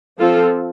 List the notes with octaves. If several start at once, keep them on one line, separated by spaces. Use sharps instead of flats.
F3 C4 F4 A4